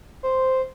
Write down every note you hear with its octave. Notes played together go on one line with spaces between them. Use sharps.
C5